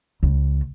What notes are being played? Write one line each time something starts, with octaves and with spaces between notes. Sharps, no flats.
C#2